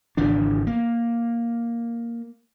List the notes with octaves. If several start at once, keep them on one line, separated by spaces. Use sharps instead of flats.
G#1 C#3 E3 D4
A#3